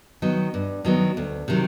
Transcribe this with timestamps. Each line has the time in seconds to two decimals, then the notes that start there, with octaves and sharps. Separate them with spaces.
0.22 D#3 F#3 B3
0.54 G2
0.85 D#3 F#3 B3
1.17 D2
1.48 C3 D#3 F#3